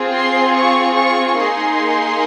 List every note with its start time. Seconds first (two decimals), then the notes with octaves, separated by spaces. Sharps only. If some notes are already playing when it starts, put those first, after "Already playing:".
Already playing: C4 F4 G#4
0.13 C6
0.55 C#6
0.95 C#6
1.37 A#3 D#4 G#4 C6